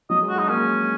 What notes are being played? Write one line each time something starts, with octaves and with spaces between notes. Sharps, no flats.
F#3 D#5
G#3
F#4
G#3 D#4
A#3 C#4